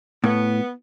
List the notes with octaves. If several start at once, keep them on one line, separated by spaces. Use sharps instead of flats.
A2 B3